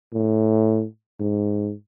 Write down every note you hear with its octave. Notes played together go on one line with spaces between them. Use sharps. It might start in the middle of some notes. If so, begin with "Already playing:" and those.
A2
G#2